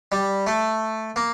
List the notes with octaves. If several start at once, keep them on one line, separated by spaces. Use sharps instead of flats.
G3
A3
A#3